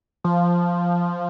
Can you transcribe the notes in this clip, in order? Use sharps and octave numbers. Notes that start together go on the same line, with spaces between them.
F3